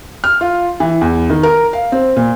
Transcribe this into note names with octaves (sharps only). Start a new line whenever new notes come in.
F6
F4
E3
E2
D#3
A#4
F5
C4
A#2